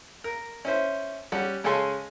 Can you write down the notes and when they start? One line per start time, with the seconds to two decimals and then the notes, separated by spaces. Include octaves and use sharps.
0.24 A#4
0.65 C#4 E4 C5
1.32 G3 C#4 F#5
1.64 C#3 G#3 C#4 A4 G#5 C6